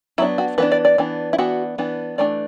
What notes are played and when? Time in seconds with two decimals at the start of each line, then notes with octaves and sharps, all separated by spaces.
0.18 F#3 B3 D4 E4
0.38 F#4
0.58 E3 B3 D4 B4
0.72 D5
0.85 D5
0.98 E3 B3 D4
1.33 E4
1.38 E3 B3 D4 F#4
1.78 E3 B3 D4
2.18 E3 A3 D4 D5